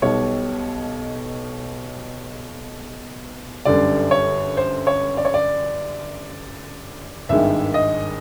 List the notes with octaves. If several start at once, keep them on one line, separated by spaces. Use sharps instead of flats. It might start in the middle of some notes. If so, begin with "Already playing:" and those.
B1 B2 G3 C#5
G1 F#2 D3 G3 D5
C#5
C5
C#5
D5
C#5
D5
G#1 G2 D#3 G#3 E5
D#5